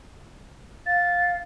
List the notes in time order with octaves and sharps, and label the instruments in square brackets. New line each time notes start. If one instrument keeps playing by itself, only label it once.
[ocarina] F5 [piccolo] A6